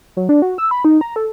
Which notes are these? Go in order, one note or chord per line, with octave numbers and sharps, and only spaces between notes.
F#3
D4
F#4
E6
B5
D#4
A#5
A4